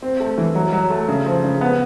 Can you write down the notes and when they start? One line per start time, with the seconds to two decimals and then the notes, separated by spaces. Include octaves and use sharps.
0.02 C4
0.20 A3
0.38 E3
0.55 F#3
0.73 F#3
0.90 A3
1.08 C#3
1.26 F3
1.44 C#3
1.61 B3